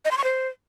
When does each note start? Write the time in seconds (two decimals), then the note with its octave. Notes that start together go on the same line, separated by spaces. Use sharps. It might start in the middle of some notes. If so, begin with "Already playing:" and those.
0.05 D#5
0.11 C6
0.18 C#6
0.24 C5